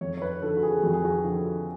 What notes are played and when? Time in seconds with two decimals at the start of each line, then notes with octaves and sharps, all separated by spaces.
0.01 F2 C#5
0.17 C#5
0.22 B4
0.42 D3 F3 A4
0.57 F#4
0.63 G#4
0.83 F2 F#4
0.93 G#4
1.05 F#4
1.24 D3 F3